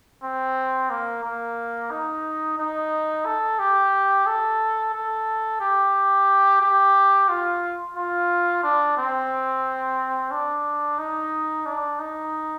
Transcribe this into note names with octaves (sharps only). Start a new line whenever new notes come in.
C4
A#3
A#3
D#4
D#4
A4
G4
A4
A4
G4
G4
F4
F4
D4
C4
D4
D#4
D4
D#4